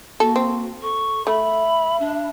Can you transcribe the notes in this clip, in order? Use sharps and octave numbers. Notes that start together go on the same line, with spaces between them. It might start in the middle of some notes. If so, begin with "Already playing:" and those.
A#3 F#4 A4
C4
A4 C#6
A3 E5 B5
D4